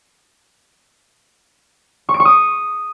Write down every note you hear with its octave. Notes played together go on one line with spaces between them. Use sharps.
C#6
D7
C#6
D#6